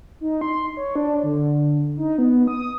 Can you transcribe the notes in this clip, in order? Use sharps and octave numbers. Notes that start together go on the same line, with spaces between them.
D#4
C6
C#5
D4
D3
D#4
B3
D#6